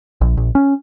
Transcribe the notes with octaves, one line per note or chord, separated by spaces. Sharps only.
A#1
A#1
C#4